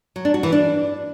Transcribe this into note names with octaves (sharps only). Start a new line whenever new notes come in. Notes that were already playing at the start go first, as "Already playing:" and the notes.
F#3
D4
F#4
E3
D4